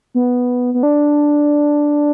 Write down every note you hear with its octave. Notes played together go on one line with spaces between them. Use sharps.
B3
B3
D4